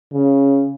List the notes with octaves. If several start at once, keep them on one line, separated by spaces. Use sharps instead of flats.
C#3